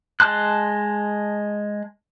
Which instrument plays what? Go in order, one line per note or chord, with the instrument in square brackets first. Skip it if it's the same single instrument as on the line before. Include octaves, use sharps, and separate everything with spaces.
[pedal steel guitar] G#3 A5 C6 F#6